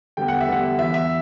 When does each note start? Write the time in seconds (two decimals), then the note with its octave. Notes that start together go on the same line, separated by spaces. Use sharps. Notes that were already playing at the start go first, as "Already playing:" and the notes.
0.17 D3 G3 B3 G5
0.28 F#5
0.41 E5
0.48 D3 G3 B3 F#5
0.79 E3 B3 E5
0.94 E5